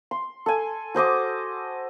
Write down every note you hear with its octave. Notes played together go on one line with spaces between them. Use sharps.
C6
A4 G#5
F#4 C5 D#5 D6